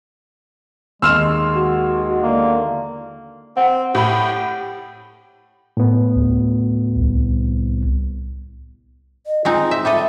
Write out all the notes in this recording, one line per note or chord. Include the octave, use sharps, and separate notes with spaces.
D#2 G#3 C6 E6 F6 E7
F#4
E2 D3 A#3 D5
C4 F#5
A2 G4 B5
A2 B3
D2
C2
D#5
G#3 C4 D#4 F4
E5
G3 A4 D#5 E5